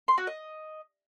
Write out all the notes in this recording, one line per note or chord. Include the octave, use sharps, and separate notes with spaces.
C6
F#4
D#5